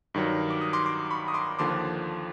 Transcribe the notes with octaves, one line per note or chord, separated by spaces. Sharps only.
G2 D#3 F#3
D6
D#6
C6 D6
C6 D6
B5 C#6
D#6
C6 D6
D#2 D3 F3 C6 D6